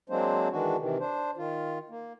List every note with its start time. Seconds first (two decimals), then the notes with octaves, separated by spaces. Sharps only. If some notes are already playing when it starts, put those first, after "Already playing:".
0.10 F#3 G#3 A#3 C4 D4 C5
0.51 D#3 E3 G#3 D4 F#4
0.79 C3 D#3 E3
0.99 D4 C5
1.37 D#3 F4
1.90 A#3